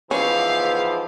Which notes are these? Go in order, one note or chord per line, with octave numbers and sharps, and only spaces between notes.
E2 G#2 F3 B3 C#4 E4 G4 F5